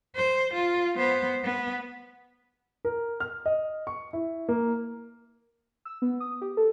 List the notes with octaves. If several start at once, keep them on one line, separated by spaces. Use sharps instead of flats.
C5
F4
B3 C5
B3
A#4
F6
D#5
C#6
E4
A#3
E6
B3
D#6
G4
A4